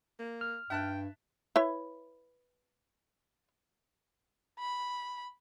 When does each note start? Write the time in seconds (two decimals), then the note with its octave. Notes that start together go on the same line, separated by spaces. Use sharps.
0.19 A#3
0.41 F6
0.70 G2 E5 G5 A5 F#6
1.56 E4 B4 C#5
4.59 B5